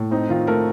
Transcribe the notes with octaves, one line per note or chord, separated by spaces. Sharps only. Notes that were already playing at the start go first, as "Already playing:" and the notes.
Already playing: A2
C4 D#4
D#3 F4
A3 A#4